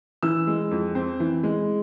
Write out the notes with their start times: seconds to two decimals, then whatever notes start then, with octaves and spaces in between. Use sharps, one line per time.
0.23 E3 E6
0.47 G#3
0.71 F2
0.95 C4
1.20 E3
1.43 G#3